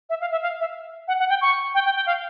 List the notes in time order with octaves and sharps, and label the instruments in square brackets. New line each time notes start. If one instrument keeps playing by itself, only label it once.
[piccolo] E5
F5
E5
F5
E5
F#5
F#5
G5
C#6
G5
G5
G5
F5